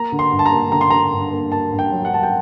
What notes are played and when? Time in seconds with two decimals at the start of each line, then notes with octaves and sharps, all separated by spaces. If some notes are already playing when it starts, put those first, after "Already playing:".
Already playing: A#3 A#5
0.12 D3
0.19 C6
0.32 G2
0.39 A5
0.46 A#5
0.52 A#3
0.72 D3 A#5
0.81 C6
0.90 D3 A#5
1.12 G2
1.32 A#3
1.52 A#3 A5
1.72 G2
1.79 G5
1.92 F#3
2.05 F#5
2.12 F#3 A5
2.23 G5